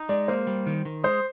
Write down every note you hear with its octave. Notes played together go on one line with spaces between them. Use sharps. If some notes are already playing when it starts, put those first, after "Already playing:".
Already playing: D#4
G#3 D5
A#3 C5
G3
D#3
D#3
G#3 C5